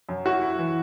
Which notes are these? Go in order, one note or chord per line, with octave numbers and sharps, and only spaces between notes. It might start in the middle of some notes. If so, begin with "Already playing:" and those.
F#2
E4 F#4
E4
E3